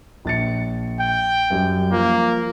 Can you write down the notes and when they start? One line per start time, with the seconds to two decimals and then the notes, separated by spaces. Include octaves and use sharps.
0.25 A#1 A6 C#7
1.00 G5
1.50 F#2 G3
1.92 F3 A#3